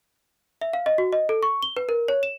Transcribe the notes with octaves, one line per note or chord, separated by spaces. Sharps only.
E5
F5
D#5
F#4
D#5
A4
C#6
G7
B4
A#4
C#5
E7